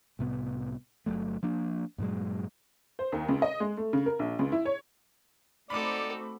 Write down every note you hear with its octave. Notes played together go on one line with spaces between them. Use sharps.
C2 A2 C3 B3
G1 F#2 F#3 A3
F3 A#3 D4
G2 A#2 F#3 G#3
C5
D#2
C#2
D#5
G#3
A3
C#3
A#4
A#1
C#2
E4
C#5
A3 C4 D#4 F#4 A4 D5 B5 D6